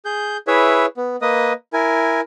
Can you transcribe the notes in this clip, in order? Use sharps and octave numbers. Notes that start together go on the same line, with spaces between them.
G#4 G6
E4 G#4 B4 C#5 E5
B3
A#3 B4 D#5 D#6
E4 A#4 G#5